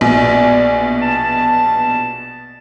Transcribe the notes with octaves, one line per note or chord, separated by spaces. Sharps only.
A#1 B2 D5
A5